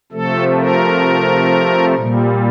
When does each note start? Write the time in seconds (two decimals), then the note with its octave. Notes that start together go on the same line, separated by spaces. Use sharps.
0.12 C3 F3 A3 A4
0.57 A#4
1.95 A#2 G3